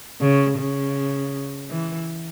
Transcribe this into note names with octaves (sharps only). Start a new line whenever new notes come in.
C#3
C#3
E3